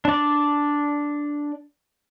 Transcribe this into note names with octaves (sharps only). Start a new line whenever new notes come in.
D4 D5